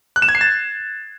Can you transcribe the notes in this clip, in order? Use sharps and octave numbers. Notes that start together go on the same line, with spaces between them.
F#6
E7
G#6
C7
A6